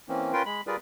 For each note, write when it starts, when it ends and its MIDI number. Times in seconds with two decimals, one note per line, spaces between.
0.09 0.33 52
0.09 0.33 58
0.09 0.33 60
0.09 0.33 61
0.33 0.43 61
0.33 0.43 65
0.33 0.43 70
0.33 0.43 71
0.33 0.43 79
0.33 0.43 84
0.46 0.61 56
0.46 0.61 83
0.67 0.76 55
0.67 0.76 65
0.67 0.76 68
0.67 0.76 70
0.67 0.76 71
0.67 0.76 74